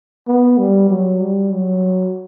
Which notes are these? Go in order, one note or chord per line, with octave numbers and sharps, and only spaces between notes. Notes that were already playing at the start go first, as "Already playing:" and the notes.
B3
G3
F#3
G3
F#3